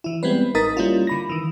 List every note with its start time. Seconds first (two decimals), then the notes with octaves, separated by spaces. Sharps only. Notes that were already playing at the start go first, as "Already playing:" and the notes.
0.04 E3 E4
0.23 G3 G#3 B3 C4 B4
0.55 G#1 D#4 A#4 D#6 A6 B6
0.77 G3 A#3 C#4 E4 F4
1.07 D3 B5 A#6
1.29 D#3 E3